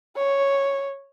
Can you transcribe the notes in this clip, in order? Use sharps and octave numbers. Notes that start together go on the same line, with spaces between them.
C#5